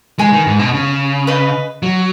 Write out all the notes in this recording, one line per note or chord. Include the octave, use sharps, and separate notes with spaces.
G#3 B4 G#5 C#6
D#3
G#2
B2
C#3
B4 D#5 B5
F#3